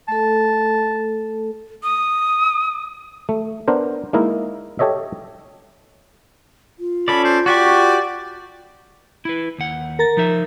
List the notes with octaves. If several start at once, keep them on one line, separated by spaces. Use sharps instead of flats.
A3 A4 A5
D#6
A3
B3 D4 A#4 C5
G#3 A#3 D#4 E4 A#4
G4 A4 C#5 D#5 E5
F4
C#4 A4 D5 B5
C5
F#4 G4 D5 C#6
E4 B4
D#2 F#5
A#4 A#5 A6
F3 D#4 E5